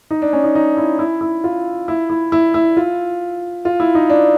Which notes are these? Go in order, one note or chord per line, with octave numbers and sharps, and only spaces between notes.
D#4
D4
C#4
D#4
D#4
E4
E4
E4
F4
E4
E4
E4
E4
F4
F4
E4
D#4
D4